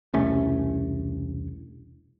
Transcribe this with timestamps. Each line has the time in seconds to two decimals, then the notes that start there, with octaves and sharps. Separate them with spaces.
0.14 E1 C2 A3 C#4